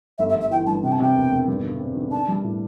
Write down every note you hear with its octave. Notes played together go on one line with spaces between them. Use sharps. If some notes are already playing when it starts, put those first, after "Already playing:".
G1 E5
E5
G1
E5
E3 G5
G2 A5
C3 G5
A5
C3 G5
E1
E1
G2
D3
C4
D3
D4 A5
G3
A2